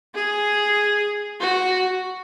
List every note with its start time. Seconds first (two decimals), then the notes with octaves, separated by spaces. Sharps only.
0.15 G#4
1.40 F#4